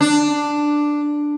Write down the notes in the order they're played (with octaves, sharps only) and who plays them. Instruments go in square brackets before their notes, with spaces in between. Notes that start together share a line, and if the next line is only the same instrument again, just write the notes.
[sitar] D4